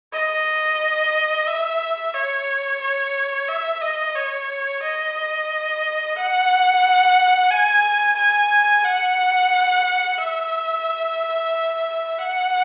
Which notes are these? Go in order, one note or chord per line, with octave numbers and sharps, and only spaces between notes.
D#5
E5
C#5
C#5
E5
D#5
C#5
D#5
F#5
G#5
G#5
F#5
E5
F#5